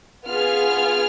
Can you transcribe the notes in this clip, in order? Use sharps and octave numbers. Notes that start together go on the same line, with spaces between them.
B3 F4 G#4 F6